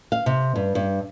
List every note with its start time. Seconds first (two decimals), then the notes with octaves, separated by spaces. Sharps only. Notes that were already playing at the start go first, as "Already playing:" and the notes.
0.12 F5
0.26 C3
0.56 G2
0.75 G2